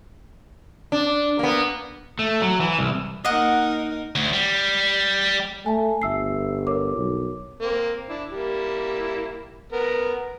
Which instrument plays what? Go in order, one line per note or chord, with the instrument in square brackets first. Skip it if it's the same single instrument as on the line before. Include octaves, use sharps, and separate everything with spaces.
[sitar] D4
A#3 B3
[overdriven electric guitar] A3
F#3
E3
C2
[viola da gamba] A#3 D#4 A#4 [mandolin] D#5 F#5
[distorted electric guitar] D2
G3
[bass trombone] A3 [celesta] G#5 A5
[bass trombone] G1 [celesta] E5 E6 C7
[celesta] A#4 C#5 D6
[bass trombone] B1
[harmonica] A#3 C4 A#4
D4 E4
G3 A#3 E4
B3 A#4